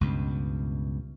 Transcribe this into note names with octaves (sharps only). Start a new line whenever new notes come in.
C#2 G2 B2